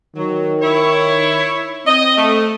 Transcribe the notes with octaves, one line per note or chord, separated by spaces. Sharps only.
D#3 F#3
E4 C#5
C4 D#5
A3